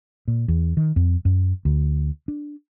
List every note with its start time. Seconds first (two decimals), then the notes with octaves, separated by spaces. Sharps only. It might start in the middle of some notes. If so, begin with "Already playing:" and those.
0.28 A#2
0.48 E2
0.77 D#3
0.96 F2
1.25 F#2
1.65 D2
2.28 D4